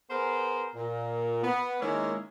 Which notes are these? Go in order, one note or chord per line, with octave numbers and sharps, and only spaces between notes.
B3 G#4 A#4 C5
A#2
B3
D#3 G#3 A#3 C#4 E4